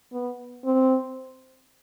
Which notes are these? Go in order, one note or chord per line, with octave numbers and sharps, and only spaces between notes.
B3
C4